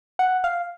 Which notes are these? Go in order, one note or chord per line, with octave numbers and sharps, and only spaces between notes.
F#5
F5